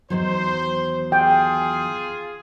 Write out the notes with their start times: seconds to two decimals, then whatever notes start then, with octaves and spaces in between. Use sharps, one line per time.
0.10 E2 D#3 F#3 C5
1.12 F4 G#4 G5